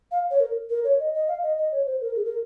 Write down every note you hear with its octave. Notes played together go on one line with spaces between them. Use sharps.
F5
C#5
A#4
A#4
C#5
D#5
D#5
F5
D#5
D#5
C#5
C5
A#4
G#4
A#4